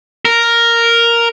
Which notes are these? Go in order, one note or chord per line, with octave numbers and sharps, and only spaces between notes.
A#4